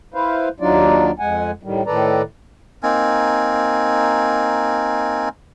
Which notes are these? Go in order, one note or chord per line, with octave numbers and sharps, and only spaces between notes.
E4 B4 C5 F5
D#2 F#3 D4 D#4 F4 D5
F2 G#3 F#5 G#5
A2 D#3 G3
A2 D#3 A4 B4 D5 A#5
A#3 C4 D#4 G#5